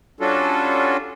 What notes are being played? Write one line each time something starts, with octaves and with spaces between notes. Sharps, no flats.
G3 C#4 D4 F4 F#4 A4